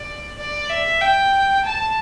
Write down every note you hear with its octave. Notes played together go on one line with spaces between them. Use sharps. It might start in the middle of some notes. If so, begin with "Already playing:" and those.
Already playing: D5
D5
E5
G5
A5